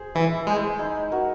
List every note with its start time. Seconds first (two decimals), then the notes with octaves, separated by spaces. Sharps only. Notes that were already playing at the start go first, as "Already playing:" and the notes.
Already playing: G#4 C5
0.15 E3 E4
0.47 G#3 G#4 C5
0.79 D#4
1.12 F#4 A#4